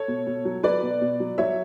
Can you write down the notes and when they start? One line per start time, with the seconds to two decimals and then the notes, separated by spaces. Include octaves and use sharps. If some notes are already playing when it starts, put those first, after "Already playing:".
Already playing: A4 C#5
0.08 B2
0.27 B2
0.45 F#3
0.63 F#3 B4 D5
0.83 B2
1.01 B2
1.20 F#3
1.38 F#3 C#5 E5